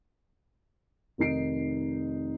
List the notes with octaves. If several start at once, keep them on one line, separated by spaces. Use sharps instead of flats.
F1 D#3 D#4 C7 D7